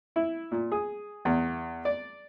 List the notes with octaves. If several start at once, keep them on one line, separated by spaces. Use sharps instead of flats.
E4
A#2
G#4
E2
D5